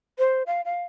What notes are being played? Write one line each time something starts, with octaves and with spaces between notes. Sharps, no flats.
C5
F5
F5